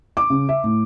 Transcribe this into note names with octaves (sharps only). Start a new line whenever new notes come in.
D6
C#3
E5
A2